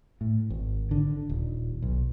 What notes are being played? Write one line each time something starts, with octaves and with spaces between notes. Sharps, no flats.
A2
G#1
D3
D#1
B1